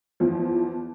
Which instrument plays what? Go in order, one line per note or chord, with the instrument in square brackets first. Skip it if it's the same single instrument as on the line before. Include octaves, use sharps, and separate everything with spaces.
[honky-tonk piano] E2 F3